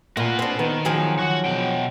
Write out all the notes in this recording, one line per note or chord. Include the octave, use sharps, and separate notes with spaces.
A#2 F#4 B4
C4 D4
D#3 B3
F3 F#3 G#4
F#4 F#5
B2 G5